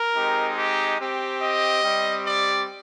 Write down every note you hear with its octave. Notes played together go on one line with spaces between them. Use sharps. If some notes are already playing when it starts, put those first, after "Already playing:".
Already playing: A#4
G#3 C4 D#4 G4
G4
C4 G4
D#5
G3 C4 G4
D5